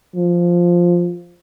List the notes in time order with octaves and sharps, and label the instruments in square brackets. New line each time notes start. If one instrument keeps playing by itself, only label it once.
[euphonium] F3